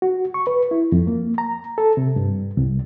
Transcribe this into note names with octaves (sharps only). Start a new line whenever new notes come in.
F#4
C#6
B4
E4
F2
A#3
A#5
A4
C3
G2
C2